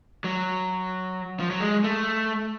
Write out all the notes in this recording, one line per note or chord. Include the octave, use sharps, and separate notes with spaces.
F#3
F3
F#3
G#3
A3